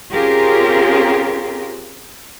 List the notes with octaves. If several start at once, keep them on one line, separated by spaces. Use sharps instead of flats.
C4 C#4 F4 G4 G#4 A#4